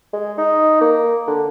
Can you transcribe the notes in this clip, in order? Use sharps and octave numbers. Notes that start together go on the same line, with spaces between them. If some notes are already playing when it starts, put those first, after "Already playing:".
G#3
D#4
A#3
D3